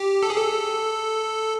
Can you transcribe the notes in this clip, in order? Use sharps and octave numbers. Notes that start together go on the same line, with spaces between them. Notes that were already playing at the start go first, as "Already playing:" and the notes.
Already playing: G4
A4
G#4
A4